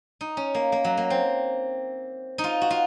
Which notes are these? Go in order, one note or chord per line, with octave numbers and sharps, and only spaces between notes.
D#4
C#4
A#3
A#3
F#3
A#3
C4
D#4
F4
F#4
F4